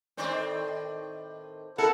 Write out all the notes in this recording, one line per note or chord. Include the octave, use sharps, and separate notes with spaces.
A2 D#3 C4 C5 D5
E4 A4 A#4 F#5